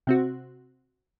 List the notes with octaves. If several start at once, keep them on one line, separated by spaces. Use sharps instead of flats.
C3 C4 F#4